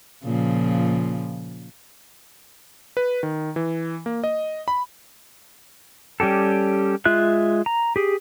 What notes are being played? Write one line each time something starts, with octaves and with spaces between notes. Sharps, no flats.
A#2 C#3 F3
B4
D#3
E3
A#3
D#5
B5
G3 C#4 G4 A4
G#3 F4 E5 F#6
A#5
G4 G#4